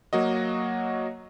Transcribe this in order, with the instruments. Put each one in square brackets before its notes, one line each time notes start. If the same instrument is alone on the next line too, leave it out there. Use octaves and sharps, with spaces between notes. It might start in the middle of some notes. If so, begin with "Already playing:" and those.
[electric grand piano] F#3 A#3 F#4 D#5